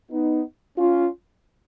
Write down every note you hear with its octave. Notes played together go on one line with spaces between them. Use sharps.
B3 D#4
C#4 F4